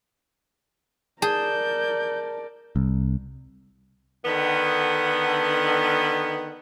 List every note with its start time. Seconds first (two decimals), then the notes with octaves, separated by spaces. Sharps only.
1.22 G#4 A#4 D5 A5 G6
2.76 C2
4.25 D3 D#3 B3